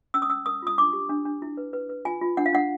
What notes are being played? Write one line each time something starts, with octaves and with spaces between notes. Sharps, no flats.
C#4 E6
D#6
C#4 E6
A#4 D#6
F4 D#6
D4 D6
G4
D4
D4
E4
B4
B4
B4
F4 G#5
F4
D4 F#5
F5
D4 F#5